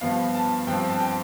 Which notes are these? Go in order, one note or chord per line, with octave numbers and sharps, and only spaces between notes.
G2 F3 B3 F5
A5
G2 F3 C4 G5
A5
G5